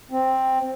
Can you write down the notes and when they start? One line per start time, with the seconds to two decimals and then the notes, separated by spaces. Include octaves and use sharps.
0.11 C4